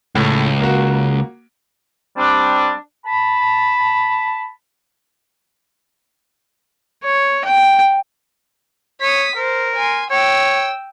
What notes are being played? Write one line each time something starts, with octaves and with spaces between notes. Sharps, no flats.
C#2 A2
A#3 F#4
G3 C4 D4
A5 B5
C#5
G5
C#5 D#6 B6
A#4 C5
G#5 C6
C#5 G5 E6